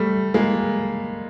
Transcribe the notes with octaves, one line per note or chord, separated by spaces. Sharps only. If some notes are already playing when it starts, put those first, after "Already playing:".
Already playing: G3 A3
G#3 A#3